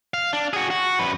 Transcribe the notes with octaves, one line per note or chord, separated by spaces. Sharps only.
F5
D4
F#4 G#4
F#4
F#2 B4